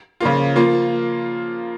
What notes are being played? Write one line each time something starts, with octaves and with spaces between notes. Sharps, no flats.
C#3 F3 A#3 F4
F3 A#3 F4